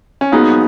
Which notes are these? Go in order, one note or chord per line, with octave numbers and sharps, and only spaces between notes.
C#4
G#2 F#3 A#3 B3 D#4 G#4